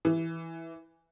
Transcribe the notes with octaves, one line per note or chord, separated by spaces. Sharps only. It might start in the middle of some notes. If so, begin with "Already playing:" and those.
E3